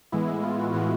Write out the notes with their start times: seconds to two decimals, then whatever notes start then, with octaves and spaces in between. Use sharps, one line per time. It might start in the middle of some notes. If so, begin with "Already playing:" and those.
0.12 A2 E3 G#3 B3 E4
0.28 E4
0.43 F4
0.59 F#4
0.74 A2 E3 G#3 B3 F#4